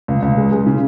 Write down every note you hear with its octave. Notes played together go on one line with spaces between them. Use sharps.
C#2
C#2
G#3
G#3
C#3